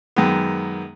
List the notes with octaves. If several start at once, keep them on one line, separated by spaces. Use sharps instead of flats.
F#2 D#3 G#3 B3